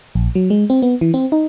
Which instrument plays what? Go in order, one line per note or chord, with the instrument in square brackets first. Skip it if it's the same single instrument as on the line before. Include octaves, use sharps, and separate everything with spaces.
[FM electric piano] A#1
F#3
G#3
C4
B3
E3
C4
D#4